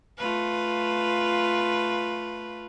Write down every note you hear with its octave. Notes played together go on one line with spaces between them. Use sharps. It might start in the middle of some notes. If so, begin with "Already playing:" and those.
A3 F4 B4